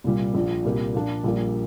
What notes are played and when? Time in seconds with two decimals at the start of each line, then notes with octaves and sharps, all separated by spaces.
0.04 C2 A#2 G3
0.34 A#1 A#2 F3
0.65 C2 A#2 A#3 G4
0.94 A#2 F3 A#3 D4 F4
1.24 A#1 A#2 G3 A#3